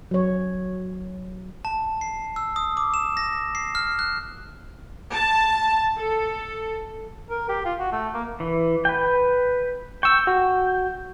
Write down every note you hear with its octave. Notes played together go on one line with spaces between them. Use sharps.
F#3 C#5
A5
C7
E6
D#6
D6
E7
A#6
C7
F6
F#6
A5
A4
A#4
G4
F4
F#4
A3
A#3
E3
B4 G5
G5 C#6 E6
F#4